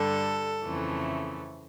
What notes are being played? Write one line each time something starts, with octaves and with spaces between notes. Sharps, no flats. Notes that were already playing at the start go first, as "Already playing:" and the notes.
Already playing: G2 D3 G3 A4
F2 C#3 E3 A3